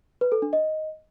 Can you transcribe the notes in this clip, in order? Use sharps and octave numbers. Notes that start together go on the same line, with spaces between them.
B4
A4
D4
D#5